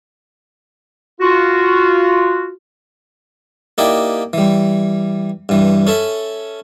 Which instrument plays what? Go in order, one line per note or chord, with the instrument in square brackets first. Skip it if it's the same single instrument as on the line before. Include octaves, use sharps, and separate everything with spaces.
[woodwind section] F4 F#4
[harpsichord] A#3 D#4 E4 G4 D5
E3 G3
G2 E3
C#4 A4 E5